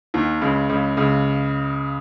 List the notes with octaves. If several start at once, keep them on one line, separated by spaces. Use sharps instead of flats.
D#2 D#3
C#2 C#3
C#2 C#3
C#2 C#3